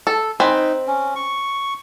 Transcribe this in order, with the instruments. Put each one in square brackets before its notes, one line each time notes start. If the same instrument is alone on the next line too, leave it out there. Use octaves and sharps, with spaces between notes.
[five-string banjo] A4
[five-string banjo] C4 B4 G#5 [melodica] D#4
[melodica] C#4
C#6